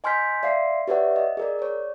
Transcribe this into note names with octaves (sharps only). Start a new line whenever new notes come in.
D#5 G#5 C6 F6 G6 B6
D5 E5 F5 C6 C7
G4 B4 C#5 D5 E5 F#5
D#5
G#4 A#4 D5
C#5 D5